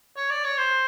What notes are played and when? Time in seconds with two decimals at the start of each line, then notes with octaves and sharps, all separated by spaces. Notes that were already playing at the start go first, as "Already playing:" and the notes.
0.17 C#5
0.30 D5
0.45 C#5
0.57 C5